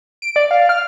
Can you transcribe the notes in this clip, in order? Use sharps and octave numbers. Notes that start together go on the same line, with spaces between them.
D7
D5
F5
F6